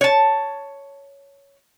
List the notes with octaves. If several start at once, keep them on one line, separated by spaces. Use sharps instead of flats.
C#5 A5